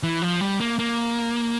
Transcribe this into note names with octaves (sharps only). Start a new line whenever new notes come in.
E3
F3
G3
A#3
A#3